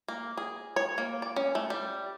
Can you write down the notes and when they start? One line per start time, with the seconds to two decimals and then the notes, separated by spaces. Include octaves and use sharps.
0.08 A#3
0.37 G#4
0.76 C#5
0.98 A#3
1.22 D5
1.36 C#4
1.55 A3
1.70 G3